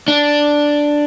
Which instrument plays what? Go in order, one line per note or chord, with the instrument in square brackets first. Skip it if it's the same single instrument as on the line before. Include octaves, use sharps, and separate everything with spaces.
[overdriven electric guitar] D4